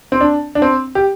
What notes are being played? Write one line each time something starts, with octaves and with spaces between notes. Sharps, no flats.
C4
D4
D4
C4
G4